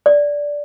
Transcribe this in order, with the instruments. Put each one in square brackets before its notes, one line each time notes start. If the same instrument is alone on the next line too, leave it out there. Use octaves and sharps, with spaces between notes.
[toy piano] D5